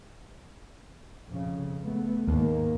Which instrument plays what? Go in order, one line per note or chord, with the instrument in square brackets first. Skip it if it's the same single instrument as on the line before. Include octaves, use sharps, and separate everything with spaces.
[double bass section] F2 C#3
A3 B3
[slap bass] D#2 [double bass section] G#2 D#3 A#3